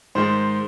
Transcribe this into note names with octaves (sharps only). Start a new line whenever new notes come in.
G#2 D#3 G#3 C5